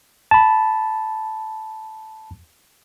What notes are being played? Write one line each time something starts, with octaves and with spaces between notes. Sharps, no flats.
A5 B5